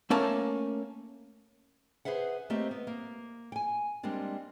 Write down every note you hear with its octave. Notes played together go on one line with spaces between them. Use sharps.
A3 A#3 C#4 A5
G#4 B4 C5 E5 F#5
A3 A#3 C4 G4 D#5 E5
B3
A#3
G5 G#5
G3 G#3 A#3 C4 D4